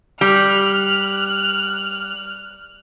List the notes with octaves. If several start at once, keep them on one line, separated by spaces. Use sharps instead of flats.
G3 F6 F#6